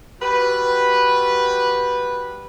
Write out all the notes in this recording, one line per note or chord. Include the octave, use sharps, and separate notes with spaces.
G3 F#4 B4